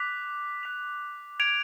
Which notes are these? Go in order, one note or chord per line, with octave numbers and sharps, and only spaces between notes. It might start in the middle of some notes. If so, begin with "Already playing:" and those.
Already playing: D6 F#6 B6 F7
F#6 B6 F7
G#6 D7 F7